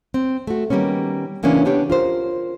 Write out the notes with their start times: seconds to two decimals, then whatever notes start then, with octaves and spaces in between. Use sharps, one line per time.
0.14 C4
0.47 A3 F#4
0.70 D#3 G3 A#3 B3 C#4
1.43 C#3 E3 A#3 B3 C#4 D4
1.65 B3 D4 G4 C#5
1.90 F4 A#4 C5